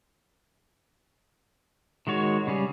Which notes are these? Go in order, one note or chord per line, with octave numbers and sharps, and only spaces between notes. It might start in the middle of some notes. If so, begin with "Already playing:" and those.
D#3 G#3 F#4 C#5
C#3 G3 G#4